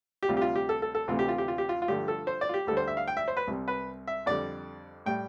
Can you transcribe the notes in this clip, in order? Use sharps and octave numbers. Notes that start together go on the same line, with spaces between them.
G4
D2 C3 G3 F4
G4
F4
G4
A4
A4
A4
D2 C3 E3 A3 F4
G4
F4
G4
F4
G4
F4
F4
G2 D3 F3 A3 G4
A4
C5
D5
F4
G4
D2 D3 G3 A4
C5
E5
F5
G5
E5
C5
B4
C2 C3 G3
B4
E5
F2 D3 G3 D5
A2 G3 G5